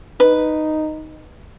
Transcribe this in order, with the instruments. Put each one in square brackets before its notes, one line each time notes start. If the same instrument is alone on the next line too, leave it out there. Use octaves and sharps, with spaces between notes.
[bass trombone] D#4 [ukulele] B4